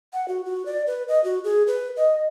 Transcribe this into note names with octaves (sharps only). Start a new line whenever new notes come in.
F#5
F#4
F#4
D5
B4
D#5
F#4
G#4
B4
D#5